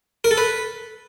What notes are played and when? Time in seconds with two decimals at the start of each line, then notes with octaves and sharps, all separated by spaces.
0.24 A#4
0.31 A4
0.38 B4